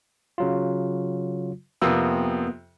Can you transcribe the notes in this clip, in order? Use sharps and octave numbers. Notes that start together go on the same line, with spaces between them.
C#3 F#3 F4
F2 C3 A#3 B3 D#6 E6